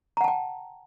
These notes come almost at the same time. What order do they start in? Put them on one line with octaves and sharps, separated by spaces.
A#5 F#5 A5 G5